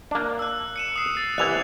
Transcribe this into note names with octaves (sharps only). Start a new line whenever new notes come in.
A#3 D4
E6 F#6
C#7 D#7 E7
D#6 C7
A6
C2 E3 E4 F#6 F7